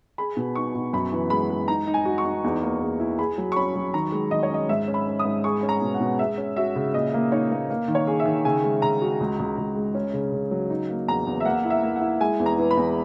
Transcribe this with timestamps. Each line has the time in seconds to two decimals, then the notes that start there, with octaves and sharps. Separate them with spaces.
0.18 G#4 B5
0.37 B2
0.55 D#4 C#6
0.75 B2
0.93 F#2 B5
1.12 E3
1.30 G#3 B5
1.50 G#3
1.68 D#4 A#5
1.87 D#4
1.94 G#5
2.05 F#4
2.18 C#6
2.25 D#4
2.44 E2
2.63 A#3
2.81 E2
3.00 E4
3.18 G#4 B5
3.38 F#3
3.52 C#6
3.56 C#4 B5
3.76 F#3
3.93 D#3 A#5
4.12 G#3
4.31 D#3 D#5
4.43 C#5
4.50 C#4 D#5
4.69 G#2 E5
4.88 C#4
4.94 B5
5.07 C#4
5.19 D#6
5.25 G#2
5.44 G#4 C#6
5.63 C#4
5.69 A#5
5.82 B2
5.94 F#5
6.00 B2
6.19 G#3 E5
6.38 C#4
6.56 F#4 E5
6.76 C#3
6.94 A#2 D#5
7.14 A#3
7.32 D#4 C#5
7.51 A#3
7.70 A#3
7.88 D#3
7.95 C#5
8.07 G#4
8.20 E5
8.25 D#3
8.45 C#3 G#5
8.64 G#3
8.82 C#3 A#5
9.02 F#4
9.20 C#2
9.39 C#2
9.58 C#2
9.76 G#3
9.95 C#4
10.13 C#3
10.32 C#3
10.51 F#3
10.70 D#4
10.90 A#3
11.08 E2 A#5
11.27 E2
11.40 E5
11.45 A#3 F#5
11.65 E4
11.70 E5
11.83 A#3
11.96 F#5
12.01 E4
12.21 G#3 G#5
12.39 E2
12.46 A#5
12.58 E3
12.71 B5
12.77 E2